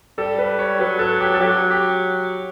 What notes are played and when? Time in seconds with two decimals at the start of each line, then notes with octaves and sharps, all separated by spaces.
0.18 G3 A4
0.39 B4
0.59 C#5
0.79 F#3 B4
0.99 A4
1.20 G4
1.34 A4
1.40 F#3 G4
1.71 G4